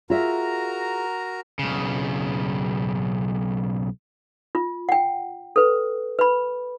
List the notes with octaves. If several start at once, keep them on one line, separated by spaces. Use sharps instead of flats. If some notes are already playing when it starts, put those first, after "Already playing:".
F4 F#4 G#4 A#4 E5 A#5
B1 C#3
F4
F#5 G5
A4 B4
B4 B5